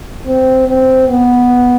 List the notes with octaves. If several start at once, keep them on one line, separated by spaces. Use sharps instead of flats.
C4
C4
B3